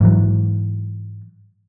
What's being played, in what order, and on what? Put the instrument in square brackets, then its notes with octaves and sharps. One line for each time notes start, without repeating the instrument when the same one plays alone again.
[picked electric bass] G#2 E3 F#3